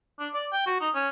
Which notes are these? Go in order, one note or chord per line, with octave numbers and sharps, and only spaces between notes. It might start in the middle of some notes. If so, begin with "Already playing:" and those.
D4
D5
G5
F#4
D#4
C#4